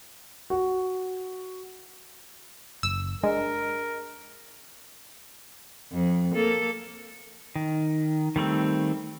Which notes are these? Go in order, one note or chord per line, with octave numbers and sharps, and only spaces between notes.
F#4
F#1 E6
G#3 D4 A#4
F2
A#3 A4
D#3
D#3 G3 A3 C4